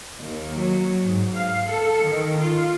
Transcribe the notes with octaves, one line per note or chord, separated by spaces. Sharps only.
D#2
F#3
G#2
F5
A4
D#3
F4